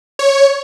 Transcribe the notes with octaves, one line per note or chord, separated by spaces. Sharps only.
C#5